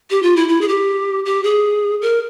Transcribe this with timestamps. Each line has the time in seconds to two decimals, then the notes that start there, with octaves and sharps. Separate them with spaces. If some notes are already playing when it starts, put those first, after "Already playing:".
0.10 G4
0.23 F4
0.36 E4
0.49 E4
0.61 G#4
0.68 G4
1.26 G4
1.44 G#4
2.02 A#4